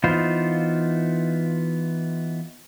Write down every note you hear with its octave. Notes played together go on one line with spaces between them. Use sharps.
E3 B3 D#4 F4 C5